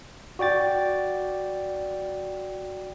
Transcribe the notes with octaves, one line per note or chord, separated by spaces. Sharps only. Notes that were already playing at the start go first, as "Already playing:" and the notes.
F#4 D5 G5 A6